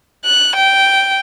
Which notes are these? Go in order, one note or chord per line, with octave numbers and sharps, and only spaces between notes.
F#6
G5